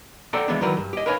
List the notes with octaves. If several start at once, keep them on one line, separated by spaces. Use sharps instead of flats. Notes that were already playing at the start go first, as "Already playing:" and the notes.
A4 C5 D5 F#5 G5 A#5
E3 G#3 B3 D4
D#3 E3 F#3 A#4 B4
G2
G4 D#5
A#4 B4 C#5 F5 G5 G#5